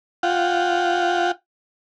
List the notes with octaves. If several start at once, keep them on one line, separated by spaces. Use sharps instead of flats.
F4 F#5 G5